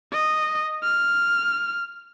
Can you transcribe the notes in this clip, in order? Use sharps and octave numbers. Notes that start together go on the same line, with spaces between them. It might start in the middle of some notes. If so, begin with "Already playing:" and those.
D#5
F6